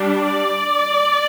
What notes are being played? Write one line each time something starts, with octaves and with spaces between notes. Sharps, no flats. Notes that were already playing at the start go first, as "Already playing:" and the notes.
Already playing: G3 D4
D5